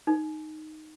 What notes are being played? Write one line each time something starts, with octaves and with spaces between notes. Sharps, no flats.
D#4